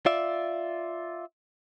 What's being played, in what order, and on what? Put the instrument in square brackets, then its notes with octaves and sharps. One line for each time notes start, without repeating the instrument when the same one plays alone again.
[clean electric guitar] F4 D5 E5